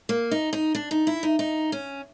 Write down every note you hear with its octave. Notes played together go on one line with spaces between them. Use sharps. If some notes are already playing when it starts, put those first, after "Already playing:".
A#3
D#4
D#4
D4
D#4
E4
D#4
D#4
C#4